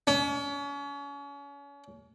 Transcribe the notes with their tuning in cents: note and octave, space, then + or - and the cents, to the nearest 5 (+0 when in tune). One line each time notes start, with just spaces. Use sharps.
C#4 +35